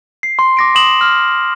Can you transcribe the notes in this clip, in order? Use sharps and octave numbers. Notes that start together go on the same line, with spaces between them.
C7
C6
D6 A#6 D7
C6 D#6 E7 F#7
F6